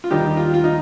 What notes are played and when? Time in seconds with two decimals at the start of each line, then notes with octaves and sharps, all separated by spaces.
0.04 F4
0.11 D#2 D#3 G3 D#4 G4
0.37 F4
0.54 F4
0.64 D#4